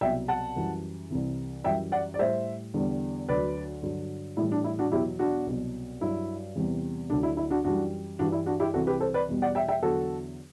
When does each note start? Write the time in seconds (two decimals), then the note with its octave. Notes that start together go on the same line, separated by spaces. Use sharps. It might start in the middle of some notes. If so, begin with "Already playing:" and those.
0.01 C2 B2 F#3 E5 G5
0.28 F#5 A5
0.56 F#2 E3 G3
1.11 C2 C3 E3
1.64 F#2 E3 G3 E5 G5
1.92 D5 F#5
2.14 D5
2.19 A2 G3 C5 E5
2.74 E2 D3 G3
3.28 D2 D3 F#3 B4 D5
3.82 G2 D3 F#3
4.37 A2 E3 G3 E4
4.52 D4
4.64 E4
4.79 D4 F#4
4.92 E2 B2 F#3 E4 G4
5.19 D4 F#4
5.47 C2 B2 F#3
6.01 G2 F#3 E4
6.56 E2 C3 E3 G3
7.10 D2 D3 F#3 D4
7.23 E4
7.37 E4
7.50 D4 F#4
7.64 F#2 E3 G3 D4 F#4
8.19 G2 E3 G3 D4 F#4
8.32 E4
8.46 D4 F#4
8.60 E4 G4
8.74 C2 C3 E3 F#4 A4
8.87 G4 B4
9.00 A4 C5
9.14 B4 D5
9.28 E2 B2 G3
9.42 D5 F#5
9.55 E5 G5
9.68 E5 G5
9.83 E2 D3 F#3 F#4 A4